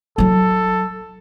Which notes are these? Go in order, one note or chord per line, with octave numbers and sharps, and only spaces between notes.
F#3 E4 A4